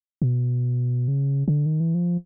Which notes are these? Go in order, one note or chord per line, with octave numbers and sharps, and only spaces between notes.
B2
C#3
C#3
D3
D#3
E3
F3